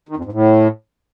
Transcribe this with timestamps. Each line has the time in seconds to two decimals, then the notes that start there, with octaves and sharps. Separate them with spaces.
0.09 D#3
0.17 F2
0.25 G#2
0.32 A2